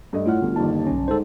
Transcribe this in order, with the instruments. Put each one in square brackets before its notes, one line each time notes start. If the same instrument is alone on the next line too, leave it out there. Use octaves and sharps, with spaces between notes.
[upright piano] G2 A3 D#5
[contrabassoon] A2 [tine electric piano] F4 F6 [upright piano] C#5 F#5
[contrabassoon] G1 [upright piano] D2
[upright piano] G1 A5 [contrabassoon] D#2
[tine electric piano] B1 C#4
[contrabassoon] G#2 [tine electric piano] A4 C5